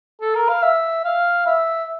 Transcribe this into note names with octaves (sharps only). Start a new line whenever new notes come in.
A4
A#4
F5
E5
F5
E5